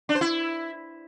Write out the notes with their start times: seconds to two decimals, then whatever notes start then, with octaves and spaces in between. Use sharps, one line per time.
0.09 D4
0.15 C5
0.21 E4